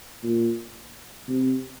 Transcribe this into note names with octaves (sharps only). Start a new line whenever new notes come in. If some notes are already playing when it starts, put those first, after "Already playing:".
A#2
C3